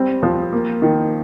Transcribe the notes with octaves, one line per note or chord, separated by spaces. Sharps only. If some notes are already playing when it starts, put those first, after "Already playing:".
Already playing: G3 C4
F3
A#3
D#3